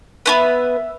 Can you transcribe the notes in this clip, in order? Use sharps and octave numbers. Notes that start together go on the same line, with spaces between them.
B3 C#4 B4 E5